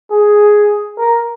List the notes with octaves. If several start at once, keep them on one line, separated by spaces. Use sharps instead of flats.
G#4
A#4